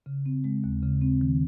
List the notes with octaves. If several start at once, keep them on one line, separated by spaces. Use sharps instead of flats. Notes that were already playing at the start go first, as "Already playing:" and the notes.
C#3
C4
G#3
D#2
C#3
C4
D#3